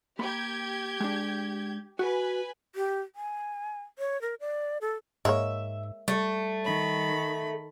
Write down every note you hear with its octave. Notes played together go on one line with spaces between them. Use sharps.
A#3 G4 B5 G6 G#6
G#3 D4
F#4 B4 G#5
G4
G#5
C#5
A#4
D5
A4
G#2 G#3 A#3 C#5 E5
G3 A3
D#3 B5